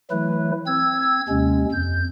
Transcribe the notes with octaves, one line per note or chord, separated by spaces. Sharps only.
E3 F#3 A3 E4 B4
C4 E6 G#6
D#2 C3 G#3 C#4
F2 G6